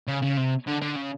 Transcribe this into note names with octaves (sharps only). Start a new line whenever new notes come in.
C#3
C#3
C3
D3
D3
C#3